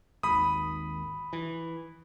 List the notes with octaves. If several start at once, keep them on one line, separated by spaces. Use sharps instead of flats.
G#1 D#2 B5 D#6
E3